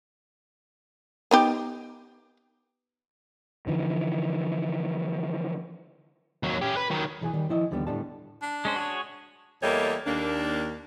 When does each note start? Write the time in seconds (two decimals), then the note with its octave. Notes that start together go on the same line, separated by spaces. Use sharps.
1.31 B3 D#4 G4
3.67 D3 E3 F3
6.43 D#2 F#3
6.62 C#4 G4
6.77 B4
6.91 D#3 F#3
7.21 B1 E3 G#4 G#5
7.34 D#3 G3
7.49 F3 E4 D#5
7.71 D#2 D3 G3 B3
7.87 A2 D3 G3 A5
8.42 D4
8.65 G#3 C#4 C5
8.76 F#4 G#4 C#5
9.62 E2 G3 A3 A#3 C#5 D#5
10.06 D#2 A#3 D4